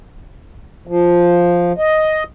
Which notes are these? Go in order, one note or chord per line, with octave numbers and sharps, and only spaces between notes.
F3
D#5